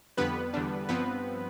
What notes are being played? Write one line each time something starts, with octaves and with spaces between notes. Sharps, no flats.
F2 D3 G3 B3 B4
E2 D3 G3 D4
G2 F3 B3 C4 B4